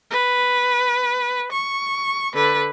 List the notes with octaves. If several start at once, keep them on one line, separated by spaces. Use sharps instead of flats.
B4
C#6
D3 B4